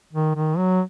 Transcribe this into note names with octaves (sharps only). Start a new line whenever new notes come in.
D#3
D#3
F#3